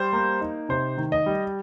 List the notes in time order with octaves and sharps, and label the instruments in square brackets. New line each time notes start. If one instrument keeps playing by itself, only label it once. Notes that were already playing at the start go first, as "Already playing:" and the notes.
Already playing: [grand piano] G3 C5
A#3
D#4
C3 C5
D#3
D#5
G3